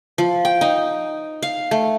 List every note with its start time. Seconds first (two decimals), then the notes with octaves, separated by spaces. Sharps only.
0.18 F3
0.45 G5
0.61 D#4
1.42 F5
1.71 A3